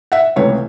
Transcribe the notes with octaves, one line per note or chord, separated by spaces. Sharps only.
E5 F#5
C#2 C3 E3 A3 B4 C#5